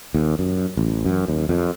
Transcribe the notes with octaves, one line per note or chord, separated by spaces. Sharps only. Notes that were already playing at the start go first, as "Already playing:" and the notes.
D#2
F#2
A1
F#2
D#2
F2